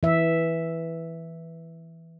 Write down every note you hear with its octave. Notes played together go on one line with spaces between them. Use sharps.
E3 E5